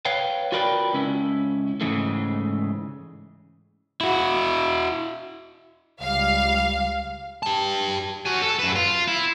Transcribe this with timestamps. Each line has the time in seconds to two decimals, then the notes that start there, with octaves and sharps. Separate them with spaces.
0.05 B4 C#5 F5 G5
0.52 F4 F#4 A#4 B4 D5 G5
0.93 C#2 C#4 E4
1.81 G#2 C#3 E3 G#3 A3
4.01 E4 F#4
6.01 C#2 G3 F5
7.43 G4 A5
8.26 F#4 G#5
8.42 A4
8.59 F#2 B4
8.76 F4
9.08 E4